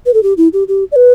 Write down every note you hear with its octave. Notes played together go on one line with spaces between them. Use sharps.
B4
A4
G4
E4
G4
G4
D5
B4